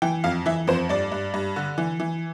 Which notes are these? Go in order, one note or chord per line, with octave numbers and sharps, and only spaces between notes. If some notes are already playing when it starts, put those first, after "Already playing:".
E3 G5
F2 F5
E3 E5
F2 C5
G2 D5
G2
G2
D3
E3
E3